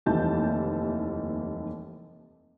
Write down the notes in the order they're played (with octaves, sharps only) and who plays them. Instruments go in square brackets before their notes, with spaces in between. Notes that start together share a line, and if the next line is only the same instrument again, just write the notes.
[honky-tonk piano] F1 D#2 E3 G3 A5 G6